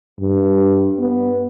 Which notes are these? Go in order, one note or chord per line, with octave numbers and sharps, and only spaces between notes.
G2
B3